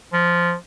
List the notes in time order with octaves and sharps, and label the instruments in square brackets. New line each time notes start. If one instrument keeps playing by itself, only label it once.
[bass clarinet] F3